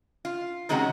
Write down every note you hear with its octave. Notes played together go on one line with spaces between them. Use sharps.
F4
C3 D#3 G#3 C4 C#4 F#4